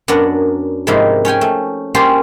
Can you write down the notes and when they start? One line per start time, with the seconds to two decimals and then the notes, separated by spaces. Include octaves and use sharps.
0.08 F#2 B3 D4 A#4 F#5
0.87 G#2 C3 F3 A#3 D#4 E4
1.25 C#4 C#5 G5 G#5
1.41 A3
1.94 A#3 C#4 F4 G4 C5